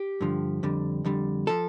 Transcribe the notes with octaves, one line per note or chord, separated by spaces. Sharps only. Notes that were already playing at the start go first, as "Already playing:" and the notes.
Already playing: G4
G2 D3 F3
F2 D3 G3
F2 D3 G3
F3 A4